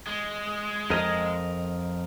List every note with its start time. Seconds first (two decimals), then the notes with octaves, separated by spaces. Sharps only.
0.07 G#3
0.90 F2 A#4 D#5